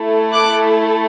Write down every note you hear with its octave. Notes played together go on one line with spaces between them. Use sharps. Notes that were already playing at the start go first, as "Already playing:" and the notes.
Already playing: A3 E4 A4
D6 F#6